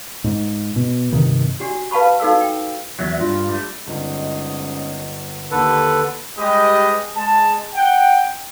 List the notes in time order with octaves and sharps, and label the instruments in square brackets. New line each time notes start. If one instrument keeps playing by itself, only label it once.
[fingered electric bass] G#2
B2
G2 C3 D#3
[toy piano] D4 F#4 G4
B4 F5 A5 B5 C#6
D#4 F#4 A4 F5 E6
G5
[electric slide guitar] E2 F#3 [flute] E5
[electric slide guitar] G2 [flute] F4
[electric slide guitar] G3 A3
[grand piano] G1 [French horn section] G#2 C#4 D#5
[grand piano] D#2 [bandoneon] D3 B4 [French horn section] D4 G4 [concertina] A4
[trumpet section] G3 G#3 G4 B4 D#5
G#3 A5
F#5 G5